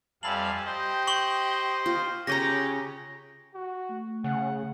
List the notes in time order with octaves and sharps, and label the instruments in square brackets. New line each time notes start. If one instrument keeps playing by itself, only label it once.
[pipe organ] F2 G3 F5 [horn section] E5 G#5 A5 [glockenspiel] B5 F#7
[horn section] G4 D#5 G5 [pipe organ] C5
[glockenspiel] C#6 F#7 G7
[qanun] F4
[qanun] C#3 D#5 A#5 [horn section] G4 C#5 [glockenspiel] A#6
[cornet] F#4
[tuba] A3
[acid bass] C#3 [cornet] F#5